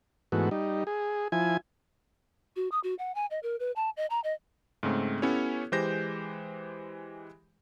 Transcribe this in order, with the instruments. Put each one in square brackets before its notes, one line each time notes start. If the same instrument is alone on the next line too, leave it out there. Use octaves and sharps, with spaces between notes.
[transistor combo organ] G#2 E3 A3 B3 F#4
G3 D#4
G#4
F3 E4 G#5
[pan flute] F#4
D#6
F#4
F#5
G#5
D#5
A#4
B4
A5
D#5
A#5
D#5
[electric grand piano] G#2 C#3 A3 C4
B3 C#4 E4 G4 A4 C#5
E3 G#3 G4 C5 G6 A#6